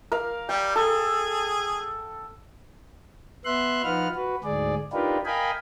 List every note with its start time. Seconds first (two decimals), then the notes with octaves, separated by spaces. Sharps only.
0.12 A#4 F5
0.49 G3 G5
0.76 G#4 A4
3.45 B3 E5 C6 F#6
3.83 F3 D#4 F4 B4 F#5 F6
4.15 F#4 B4
4.44 D2 G#2 G#4 D5
4.92 D4 D#4 F4 G4 A#4 B4
5.25 A#4 D#5 F5 G5 G#5 B5